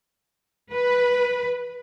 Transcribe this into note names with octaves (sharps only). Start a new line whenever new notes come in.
B4